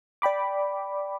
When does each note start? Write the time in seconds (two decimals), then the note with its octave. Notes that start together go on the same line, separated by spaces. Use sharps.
0.22 D5 G5 B5 D6